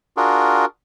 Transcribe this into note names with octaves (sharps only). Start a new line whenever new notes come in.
D4 F4 F#4 G#4 A#4